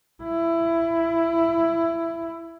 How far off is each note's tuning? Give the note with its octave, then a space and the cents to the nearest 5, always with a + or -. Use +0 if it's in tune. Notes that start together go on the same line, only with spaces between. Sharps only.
E4 +15